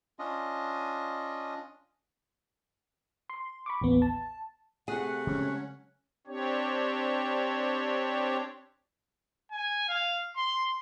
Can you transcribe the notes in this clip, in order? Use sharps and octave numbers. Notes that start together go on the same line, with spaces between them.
C#4 D4 F4 D#5
C6
B5 C#6 D6
A1 D#2 B3
A5
C3 A3 G#4 F#5
C#3 F#3 G#3 C#4
C4 D4 G4 C#5
G#5
F5
C6